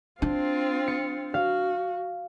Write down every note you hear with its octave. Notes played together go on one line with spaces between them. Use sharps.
C4 D4 F4
C#7
F#4 F5